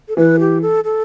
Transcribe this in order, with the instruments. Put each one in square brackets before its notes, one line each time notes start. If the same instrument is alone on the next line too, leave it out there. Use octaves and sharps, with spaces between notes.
[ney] A4
[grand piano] E3 [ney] B4
[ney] G4
A4
A4